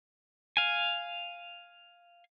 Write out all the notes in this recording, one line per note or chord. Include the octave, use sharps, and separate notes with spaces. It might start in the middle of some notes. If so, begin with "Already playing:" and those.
F5 G#5